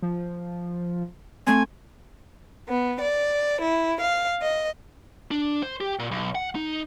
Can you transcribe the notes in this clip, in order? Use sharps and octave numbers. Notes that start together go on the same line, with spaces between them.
F3
A3 C4 G#5
B3
D5
E4
F5
D#5
D4
C5
G4
A#2
B1
F#5
D#4